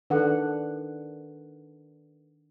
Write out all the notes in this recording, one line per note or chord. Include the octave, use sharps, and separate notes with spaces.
D#3 D4 A4 B4 F#5